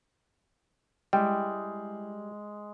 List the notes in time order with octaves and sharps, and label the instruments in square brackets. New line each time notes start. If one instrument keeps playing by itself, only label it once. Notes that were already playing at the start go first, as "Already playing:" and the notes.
[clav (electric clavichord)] G3 [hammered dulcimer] G#3 [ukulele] E4 G5